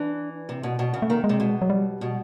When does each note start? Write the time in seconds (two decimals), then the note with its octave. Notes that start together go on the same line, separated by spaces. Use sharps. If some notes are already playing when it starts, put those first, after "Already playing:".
Already playing: E3 D4
0.49 C3
0.63 B2
0.79 B2
0.94 C#3
1.02 A3
1.10 D#3 A#3
1.24 G#3
1.29 C3
1.40 B2
1.62 F#3
1.70 G3
2.01 B2